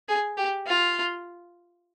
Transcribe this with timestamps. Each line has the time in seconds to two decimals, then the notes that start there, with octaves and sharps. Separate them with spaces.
0.08 G#4
0.37 G4
0.66 F4